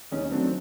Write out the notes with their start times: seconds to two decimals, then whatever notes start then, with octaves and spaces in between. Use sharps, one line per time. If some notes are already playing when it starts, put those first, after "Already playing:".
0.12 D#2 C#4 D#4
0.31 D#3 F#3 A3 C4 D4